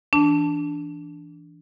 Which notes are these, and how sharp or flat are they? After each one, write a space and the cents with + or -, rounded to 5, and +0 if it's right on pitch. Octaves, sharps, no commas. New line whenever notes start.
E3 +0 D4 -10 A5 +0